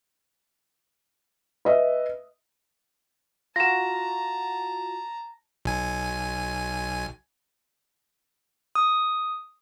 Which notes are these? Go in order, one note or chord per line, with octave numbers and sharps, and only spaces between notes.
B4 D#5 E5
F4 F#4 A5 A#5 A#6 E7
B1 G#5
D#6